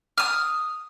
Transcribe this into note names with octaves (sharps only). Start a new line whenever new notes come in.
D#6 F6